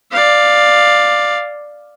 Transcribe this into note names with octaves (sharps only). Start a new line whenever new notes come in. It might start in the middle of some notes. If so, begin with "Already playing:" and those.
D5 F5